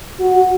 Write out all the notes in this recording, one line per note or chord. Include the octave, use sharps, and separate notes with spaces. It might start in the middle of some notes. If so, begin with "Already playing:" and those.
F#4